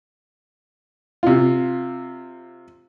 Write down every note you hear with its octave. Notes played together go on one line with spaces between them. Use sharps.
C3 F4